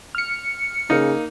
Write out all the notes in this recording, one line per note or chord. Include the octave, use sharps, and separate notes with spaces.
F6 C#7
C#3 A#3 D#4